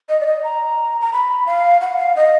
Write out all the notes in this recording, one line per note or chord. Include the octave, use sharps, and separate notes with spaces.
D#5
D5
D#5
A#5
A#5
B5
F5
F#5
F5
D#5